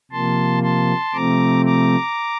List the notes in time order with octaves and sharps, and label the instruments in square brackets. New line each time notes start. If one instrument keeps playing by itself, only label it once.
[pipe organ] C3 F3 A#3 A5 C6
A5 C6
C3 F3 A3 C4 A#5 D6
A#5 D6